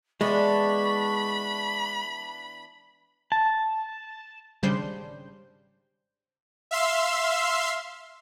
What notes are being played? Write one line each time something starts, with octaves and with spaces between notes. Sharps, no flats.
E3 G#3 B3 D4 B5 C#6
A5
G#1 C#3 G3 D4 C5 G6
E5 F5 C6 E6